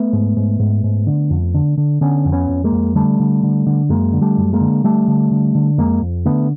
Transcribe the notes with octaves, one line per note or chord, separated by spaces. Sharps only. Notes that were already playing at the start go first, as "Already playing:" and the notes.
Already playing: A3 B3
G#2
G#2
G#2
G#2
D3
F2
D3
D3
D3 B3 C#4
F2
B3 C#4
F2
G#3 A#3
F2
D3 G3 A3
D3
D3
D3
F#2 G#3 A#3
D3
G3 A3
F#2
G#3 A#3
D3
D3 G3 A3
D3
D3
D3
F2 G#3 A#3
F2
D3 A3 B3